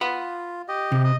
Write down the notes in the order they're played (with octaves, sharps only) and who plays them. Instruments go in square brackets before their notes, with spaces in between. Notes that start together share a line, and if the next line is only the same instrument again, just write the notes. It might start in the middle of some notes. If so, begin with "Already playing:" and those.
[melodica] F4 [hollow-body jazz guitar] F#5 B5
[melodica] G4 D#5
[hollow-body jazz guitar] C3
[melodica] D#5